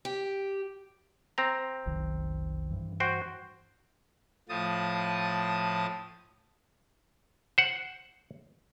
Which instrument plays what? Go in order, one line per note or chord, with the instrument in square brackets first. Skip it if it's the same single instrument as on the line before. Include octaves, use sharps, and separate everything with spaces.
[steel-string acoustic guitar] G4
[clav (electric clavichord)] C4 A#5
[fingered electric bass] F1 B1 D#3
G2 E3
[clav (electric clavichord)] F#4 C5 G5
[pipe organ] A2 F3 A5 D#6
[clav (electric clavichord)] C5 F#5